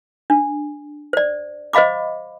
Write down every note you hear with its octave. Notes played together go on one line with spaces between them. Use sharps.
D4
C5 D5
C5 D#5 F5 B5 D6